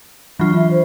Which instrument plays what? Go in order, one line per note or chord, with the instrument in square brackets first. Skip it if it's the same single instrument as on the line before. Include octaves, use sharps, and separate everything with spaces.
[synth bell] E3 F#3 F4 [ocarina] D4
[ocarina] E5
C5